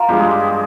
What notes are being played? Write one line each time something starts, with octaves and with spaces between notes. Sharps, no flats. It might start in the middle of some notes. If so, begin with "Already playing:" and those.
Already playing: F4 A#4
G2 F3 G#3 G4
G#4
G4
G#4